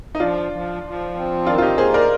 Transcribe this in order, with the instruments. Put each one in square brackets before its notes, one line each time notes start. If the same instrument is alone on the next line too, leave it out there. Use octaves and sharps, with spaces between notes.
[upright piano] D#4
[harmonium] F3 [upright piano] D4 F4
[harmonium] F3
F3
C4
[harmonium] D#3 [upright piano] D4 F4
[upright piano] F4
D#4 G4
[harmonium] A#3 [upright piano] G#4 C5
[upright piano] A#4 D5